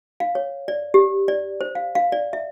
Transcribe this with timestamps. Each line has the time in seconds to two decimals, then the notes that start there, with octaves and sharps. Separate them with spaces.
0.20 F5
0.35 C#5
0.68 D5
0.94 G4
1.28 D5
1.61 C5
1.75 F5
1.95 F5
2.12 D5
2.33 E5